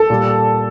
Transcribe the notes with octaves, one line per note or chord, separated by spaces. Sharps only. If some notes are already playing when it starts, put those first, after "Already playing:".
Already playing: A4
A#2 G3